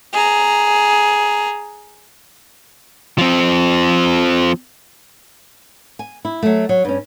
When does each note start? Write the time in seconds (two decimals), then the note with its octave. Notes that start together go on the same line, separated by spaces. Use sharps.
0.13 G#4 A#5
3.18 F3 C4
5.99 G#5
6.25 E4
6.43 F#3 A3
6.69 F#3
6.85 G2 C#4